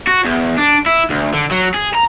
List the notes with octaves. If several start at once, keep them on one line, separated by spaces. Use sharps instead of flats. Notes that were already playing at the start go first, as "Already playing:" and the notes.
F#4
E2
D4
E4
D2
D3
F#3
G#4
A#5